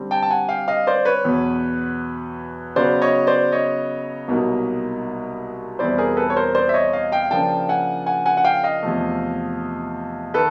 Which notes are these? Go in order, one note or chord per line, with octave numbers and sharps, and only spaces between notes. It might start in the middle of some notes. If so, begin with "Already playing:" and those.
Already playing: D3 G3 C4
G5 A5
A5
F#5 G#5
F5 G5
D#5 F5
C5 D5
B4 C#5
E2 B2 F#3 B3
C#3 F#3 B3 C5 D5
C#5 D#5
C5 D5
C#5 D#5
C2 B2 F#3 A#3 D#4
E2 B2 G3 C4 E4 C5 D5
G#4 A#4
A4 B4
C#5
A#4 C5
C5 D5
E5
C#5 D#5
D#5 F5
F5 G5
C#3 F3 A#3 D4 F4 G5 A5
F#5 G#5
F#5 G#5
F#5 G#5
F#5
F5 G5
D#5 F5
E2 C3 F3 A3
D#3 A4 B4